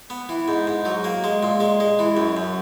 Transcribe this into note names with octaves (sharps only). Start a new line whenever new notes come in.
B3
E3
G#2
G#2
F#3
A#3
G#3
A#2
G#3
G#3
E3
F#2
F#2